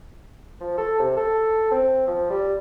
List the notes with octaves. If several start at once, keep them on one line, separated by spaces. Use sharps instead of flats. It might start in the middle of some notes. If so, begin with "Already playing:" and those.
F3
A4
C3
A4
C4
F3
G3